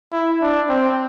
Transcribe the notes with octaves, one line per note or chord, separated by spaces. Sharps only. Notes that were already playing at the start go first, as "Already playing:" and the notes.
E4
D4
C4